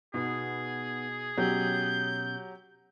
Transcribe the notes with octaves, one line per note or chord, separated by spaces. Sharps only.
B2 B3 D#4 G#4 F#5
B2 F#3 C#4 G4 G6